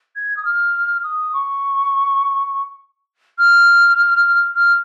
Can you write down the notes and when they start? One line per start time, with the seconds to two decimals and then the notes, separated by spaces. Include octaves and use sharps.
0.16 G#6
0.37 D#6
0.45 F6
1.03 D#6
1.33 C#6
3.39 F6
4.55 F6